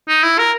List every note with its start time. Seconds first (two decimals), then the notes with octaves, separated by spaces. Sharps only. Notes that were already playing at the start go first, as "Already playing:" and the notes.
0.08 D#4
0.23 E4
0.38 A#4